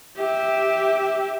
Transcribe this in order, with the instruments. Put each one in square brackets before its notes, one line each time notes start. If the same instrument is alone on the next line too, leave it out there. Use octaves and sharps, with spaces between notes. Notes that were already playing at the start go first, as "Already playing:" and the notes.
[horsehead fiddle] G4 E5